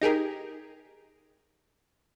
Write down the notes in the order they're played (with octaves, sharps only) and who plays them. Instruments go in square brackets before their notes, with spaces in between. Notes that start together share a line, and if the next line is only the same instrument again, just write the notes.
[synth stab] D#4 G4 G#4 A#4